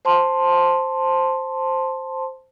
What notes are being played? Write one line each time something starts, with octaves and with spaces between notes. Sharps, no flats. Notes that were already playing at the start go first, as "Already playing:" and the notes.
C5 A5 C6